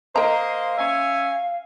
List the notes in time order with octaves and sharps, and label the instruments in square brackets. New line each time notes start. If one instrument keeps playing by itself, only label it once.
[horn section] A#3 C5 D#5 [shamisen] A#4 A#5 [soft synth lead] F5
[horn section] C#4 E5 G#5